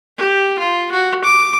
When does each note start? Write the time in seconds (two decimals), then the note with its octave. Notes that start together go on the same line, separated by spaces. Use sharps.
0.17 G4
0.59 F4
0.92 F#4
1.24 D6